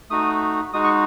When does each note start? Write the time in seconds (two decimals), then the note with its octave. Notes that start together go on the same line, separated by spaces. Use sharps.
0.10 A3 D#4 F#4 D#6
0.73 G#3 D#4 F#4 D#6
0.84 C#6